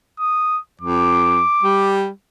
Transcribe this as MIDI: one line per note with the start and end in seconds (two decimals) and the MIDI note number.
0.20 0.60 87
0.81 1.42 41
0.81 1.97 86
1.63 2.08 55